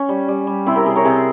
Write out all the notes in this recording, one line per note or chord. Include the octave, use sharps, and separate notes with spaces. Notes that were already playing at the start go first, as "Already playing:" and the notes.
Already playing: C#4
G3
G3
G3
C3 C4 E4
G4 A#4
C3 G#4 C5
A#4 C#5
C3 G#4 C5